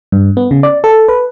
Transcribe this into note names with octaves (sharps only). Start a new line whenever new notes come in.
G2
B3
C#3
D5
A4
B4